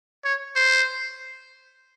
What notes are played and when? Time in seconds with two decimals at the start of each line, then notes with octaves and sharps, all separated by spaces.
0.25 C#5
0.56 C5